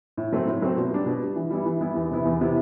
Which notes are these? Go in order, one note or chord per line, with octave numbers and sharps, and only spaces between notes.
A2
F#3 A3 C4
A2
F#3 A3 C4
B2
G3 D4
B2
G3 D4
E3
G3 B3 E4
E3
G3 B3 E4
E2
C3 E3 B3 E4
E2
C3 E3 B3 E4